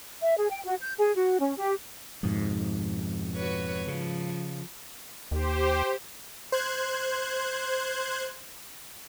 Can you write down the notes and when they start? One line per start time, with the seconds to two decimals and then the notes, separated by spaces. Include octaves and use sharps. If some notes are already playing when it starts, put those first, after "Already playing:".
0.22 E5
0.37 G#4
0.52 G5
0.65 F#4
0.82 G6
0.99 G#4
1.15 F#4
1.39 C#4
1.58 G4
2.23 F2 G#2 B2 F3
3.35 F#4 B4 C#5
3.88 C#3 F3
5.31 D#2 G4 C5
6.52 C5 F#6 G#6